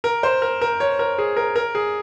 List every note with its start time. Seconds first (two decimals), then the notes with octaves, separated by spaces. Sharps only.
0.04 A#4
0.23 C5
0.42 A#4
0.61 A#4
0.80 C#5
0.99 A#4
1.18 G#4
1.37 A#4
1.56 A#4
1.75 G#4